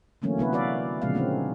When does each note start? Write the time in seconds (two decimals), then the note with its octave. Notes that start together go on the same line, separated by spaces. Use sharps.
0.22 D3 E3 F#3 A3 A#3 C#4
0.38 C3 B3 E4 B4
0.53 F#4 B4 D5 E5 F5
1.02 A#2 C#3 F3 G#3 B3 F5
1.14 D3 A#3 C4 C#4 D#4